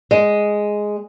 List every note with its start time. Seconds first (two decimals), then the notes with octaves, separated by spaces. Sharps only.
0.11 G#3